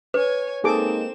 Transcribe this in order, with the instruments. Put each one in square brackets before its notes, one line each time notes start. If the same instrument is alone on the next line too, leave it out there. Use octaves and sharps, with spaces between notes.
[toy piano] B4 [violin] C#5 G#5
[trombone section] G#3 A#3 D#4 [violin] C4 E7 [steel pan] G#4 A4 D6